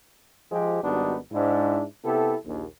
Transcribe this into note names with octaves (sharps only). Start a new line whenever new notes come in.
F3 G#3 G4
G#1 G3 B3 D4 D#4 F#4
G#2 D4 E4
C3 B3 E4 G4 A4
A#1 D#2